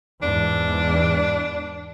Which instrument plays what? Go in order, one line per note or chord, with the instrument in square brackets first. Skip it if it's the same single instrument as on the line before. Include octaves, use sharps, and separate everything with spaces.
[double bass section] E2 G#2 [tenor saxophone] D4